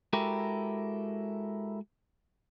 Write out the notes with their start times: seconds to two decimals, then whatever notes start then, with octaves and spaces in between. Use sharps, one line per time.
0.13 G#3 E4 F#4 G4 A4 A#4